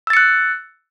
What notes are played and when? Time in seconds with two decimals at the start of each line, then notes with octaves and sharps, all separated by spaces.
0.07 E6
0.10 A6
0.13 C#7
0.17 F#6